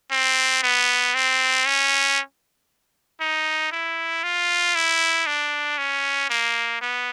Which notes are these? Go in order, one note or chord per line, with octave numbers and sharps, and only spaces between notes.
C4
B3
C4
C#4
D#4
E4
F4
E4
D4
C#4
A#3
B3